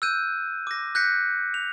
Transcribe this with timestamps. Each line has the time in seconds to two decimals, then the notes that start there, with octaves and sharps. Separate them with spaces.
0.02 E6 F#6 G6 D#7
0.67 D6 A#6
0.95 F#6 G6 A#6 B6 C#7
1.54 F7